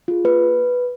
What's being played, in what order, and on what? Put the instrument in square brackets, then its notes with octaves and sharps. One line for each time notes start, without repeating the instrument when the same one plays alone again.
[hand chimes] F4 G#4
A#3 B4